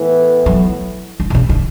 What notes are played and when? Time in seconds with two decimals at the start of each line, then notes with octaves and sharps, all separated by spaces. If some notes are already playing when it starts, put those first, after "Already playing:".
Already playing: A2 E3 B3
0.46 F#3
1.20 D3
1.30 B2
1.35 C#3
1.49 D3